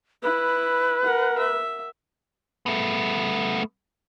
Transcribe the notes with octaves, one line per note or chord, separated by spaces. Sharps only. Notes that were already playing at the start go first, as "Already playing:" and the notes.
E4 B4
A#4 F#5
E5
A3 B3